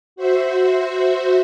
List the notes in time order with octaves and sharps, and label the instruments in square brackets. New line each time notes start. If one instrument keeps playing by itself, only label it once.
[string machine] F#4 C5 E5